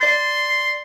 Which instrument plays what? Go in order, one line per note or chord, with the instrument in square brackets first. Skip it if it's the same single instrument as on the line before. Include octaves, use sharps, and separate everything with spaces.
[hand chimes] D5 A6 [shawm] C6